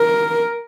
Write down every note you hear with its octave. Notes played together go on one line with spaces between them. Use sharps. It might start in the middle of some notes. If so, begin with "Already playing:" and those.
Already playing: A#4